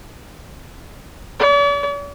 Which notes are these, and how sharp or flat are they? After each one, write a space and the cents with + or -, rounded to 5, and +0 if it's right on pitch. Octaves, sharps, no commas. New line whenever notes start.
D5 -45